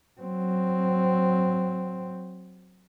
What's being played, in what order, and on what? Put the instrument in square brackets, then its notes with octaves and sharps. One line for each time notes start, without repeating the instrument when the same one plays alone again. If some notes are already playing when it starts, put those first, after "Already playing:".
[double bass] F#3 C4